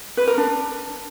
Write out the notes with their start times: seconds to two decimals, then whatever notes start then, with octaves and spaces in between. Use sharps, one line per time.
0.17 B4
0.27 A#4
0.38 D4